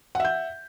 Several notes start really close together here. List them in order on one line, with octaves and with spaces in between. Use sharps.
F#5 E5 G6